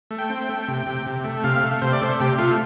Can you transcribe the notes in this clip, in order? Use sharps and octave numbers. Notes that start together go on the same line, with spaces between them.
A3
G5
C4
A3
C3
C3
C3
A3
C3 F5
A3
C3 C5
D5
A3 C5
C3 G4
A3 F4